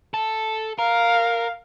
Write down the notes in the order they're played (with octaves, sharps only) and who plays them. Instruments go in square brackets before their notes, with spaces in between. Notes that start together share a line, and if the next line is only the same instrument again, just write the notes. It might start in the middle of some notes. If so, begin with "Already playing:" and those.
[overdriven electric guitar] A4
[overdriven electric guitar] A#4 [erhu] F5